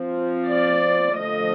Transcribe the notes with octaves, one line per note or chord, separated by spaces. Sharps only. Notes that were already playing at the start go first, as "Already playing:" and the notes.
Already playing: F3 C4
D5
D3 F3 A3 D#5